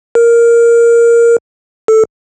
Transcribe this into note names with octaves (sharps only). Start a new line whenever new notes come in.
A#4
A4